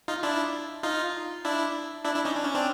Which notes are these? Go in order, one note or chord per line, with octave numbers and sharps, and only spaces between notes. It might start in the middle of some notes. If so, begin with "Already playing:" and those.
D#4 F4
D4 E4
D#4 F4
D4 E4
D4 E4
D4 E4
C#4 D#4
D4
C#4
C4 D4